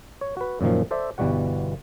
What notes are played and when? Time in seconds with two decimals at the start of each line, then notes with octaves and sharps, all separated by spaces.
0.21 C#5
0.37 F#4 B4
0.61 F#2 A#2 D#3 F3
0.91 A4 C5 D5 E5
1.18 G1 B2 E3 G3 F#4 F#5